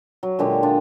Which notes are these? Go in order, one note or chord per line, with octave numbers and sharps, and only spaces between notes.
F#3
A#2 D3 G#3 G4
D4 F4